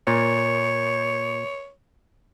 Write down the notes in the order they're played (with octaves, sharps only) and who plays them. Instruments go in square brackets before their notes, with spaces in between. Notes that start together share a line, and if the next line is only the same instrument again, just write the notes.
[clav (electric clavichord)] A#2 [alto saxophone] C#5